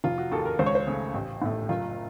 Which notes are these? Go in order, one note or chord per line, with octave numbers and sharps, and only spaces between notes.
F1 F4
F#4
D#2 D#3 A4
A#4
C#2 C5
C#5
C5
C#3 A3
A1
A2 A3
F#1 F4